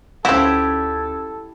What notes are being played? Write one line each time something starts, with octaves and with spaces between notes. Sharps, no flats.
D2 F3 C#4 E4 F#4 G4 A4 G#6